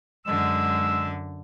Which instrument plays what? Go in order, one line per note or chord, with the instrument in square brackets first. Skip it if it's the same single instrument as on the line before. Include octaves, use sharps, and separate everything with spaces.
[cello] F#2 D3 [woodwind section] G#3 E6